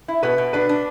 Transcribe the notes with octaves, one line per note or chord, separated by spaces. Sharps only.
E4
B2 B4 B5
B2
D4 B4 B5
D4